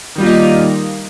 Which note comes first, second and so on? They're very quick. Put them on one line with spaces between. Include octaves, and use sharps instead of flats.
D#3 G3 F4 A#3 D#4